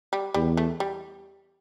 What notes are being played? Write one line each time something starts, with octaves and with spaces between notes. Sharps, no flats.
G3
E2 G3
A3
G3